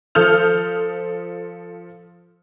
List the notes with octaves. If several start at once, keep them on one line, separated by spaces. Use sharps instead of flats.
F3 A4 D#6 F6 G6 F7